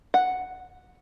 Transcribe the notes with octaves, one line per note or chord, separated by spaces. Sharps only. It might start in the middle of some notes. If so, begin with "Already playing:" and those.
F#5